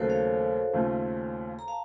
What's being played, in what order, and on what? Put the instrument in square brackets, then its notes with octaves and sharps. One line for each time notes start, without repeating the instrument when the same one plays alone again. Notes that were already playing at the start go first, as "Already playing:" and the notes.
Already playing: [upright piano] D#2 C#3 F#3 A3 [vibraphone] F#4 A4 A#4 C5
[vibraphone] C#5 F5
[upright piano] D#2 C#3 A3 C4 F4
[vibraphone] A#5
F5 A5